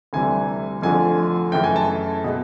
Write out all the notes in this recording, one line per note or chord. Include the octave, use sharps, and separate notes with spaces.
D2 C3 E3 G3 G#5
F2 D3 F3 A3 G#5
F#2 C#3 E3 A3 G5
G#5
A5
B2 G#3